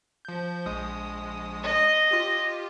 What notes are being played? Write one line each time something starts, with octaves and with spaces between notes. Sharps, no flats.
F3 G6
A#1 G#3 D#6
D#5
F4 G4